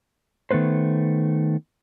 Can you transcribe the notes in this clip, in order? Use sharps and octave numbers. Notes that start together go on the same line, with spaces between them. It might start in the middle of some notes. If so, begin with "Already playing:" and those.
D#3 A3 B3 B4 C5